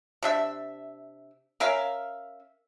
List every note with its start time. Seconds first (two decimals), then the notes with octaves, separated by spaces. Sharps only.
0.23 C3 D4 E5
1.60 C#4 A#4 E5 F5